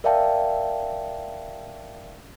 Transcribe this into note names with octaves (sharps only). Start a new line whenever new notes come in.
A#4 D5 E5 F5 G5 A5